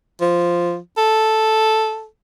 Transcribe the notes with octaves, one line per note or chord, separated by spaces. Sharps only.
F3
A4